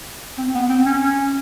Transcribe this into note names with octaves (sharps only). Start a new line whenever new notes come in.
C4
B3
C4
C#4
C#4